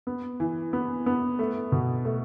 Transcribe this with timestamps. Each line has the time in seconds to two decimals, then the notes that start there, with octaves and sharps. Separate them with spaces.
0.07 B3
0.40 E3
0.73 B3
1.06 B3
1.39 A3
1.72 B2
2.05 A3